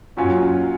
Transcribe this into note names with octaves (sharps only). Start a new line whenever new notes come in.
F#2 A#2 F#3 C#4 F4